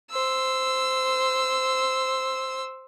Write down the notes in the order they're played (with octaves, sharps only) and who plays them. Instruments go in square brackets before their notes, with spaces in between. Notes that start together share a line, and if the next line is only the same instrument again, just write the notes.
[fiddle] C5 E6